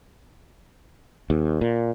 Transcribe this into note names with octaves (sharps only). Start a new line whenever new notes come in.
D#2
A#2